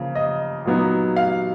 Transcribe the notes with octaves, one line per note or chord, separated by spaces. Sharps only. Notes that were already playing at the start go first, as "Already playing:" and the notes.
Already playing: C#3 F3 A#3
D#5
A#2 F#3 B3 D#4
F5